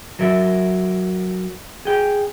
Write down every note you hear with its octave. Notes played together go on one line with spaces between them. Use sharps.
F#3 A#4 E5
G#4 G5